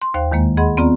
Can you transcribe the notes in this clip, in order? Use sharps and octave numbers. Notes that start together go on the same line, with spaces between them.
C6
D#2 C5 F5 G5
E2 D#3 G#3 A#3
G#4 D#5 F#5 B5 C6
B3 C4 F4 D5 A#5